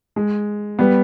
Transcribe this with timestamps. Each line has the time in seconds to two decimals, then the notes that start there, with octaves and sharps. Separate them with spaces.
0.16 G#3
0.79 G3 B3